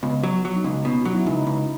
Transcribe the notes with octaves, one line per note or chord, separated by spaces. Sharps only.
C#2 B3
F#3
F#3
D#4
C#2 C#4
B2
F#3 F#4
E4
C#2 D#4
C#2